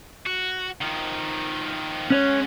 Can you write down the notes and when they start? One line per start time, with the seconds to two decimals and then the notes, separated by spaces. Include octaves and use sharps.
0.26 F#4
0.81 D#3 F3
2.10 G#3 C#4 C#5 F#5